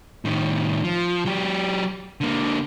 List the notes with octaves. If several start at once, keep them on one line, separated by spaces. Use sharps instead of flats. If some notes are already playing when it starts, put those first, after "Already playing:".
A2 D#3
F3
F#3 G4
D3 A#3